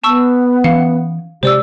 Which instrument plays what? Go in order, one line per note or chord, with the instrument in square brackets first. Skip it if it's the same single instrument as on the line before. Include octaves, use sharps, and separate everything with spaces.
[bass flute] B3 [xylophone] A5 C#6 E6
[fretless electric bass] E3 C#4 [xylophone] F5 C#7
[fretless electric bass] C3 G#3 [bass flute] G4 [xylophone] C5 D5 E6